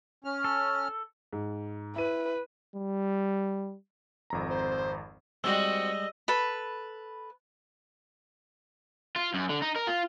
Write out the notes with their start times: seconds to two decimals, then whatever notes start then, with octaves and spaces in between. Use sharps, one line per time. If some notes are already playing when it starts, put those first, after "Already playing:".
0.24 C#4 F6
0.44 A4
1.33 G#2
1.96 E4 B4 D#7
2.76 G3
4.30 G#1 F2 A#5
4.50 C5
5.44 G3 G#3 C4 F#4 D#5 E6
6.28 A4 B4 B5
9.16 F4
9.34 F#2
9.49 D3
9.62 D#4
9.76 A#4
9.87 F4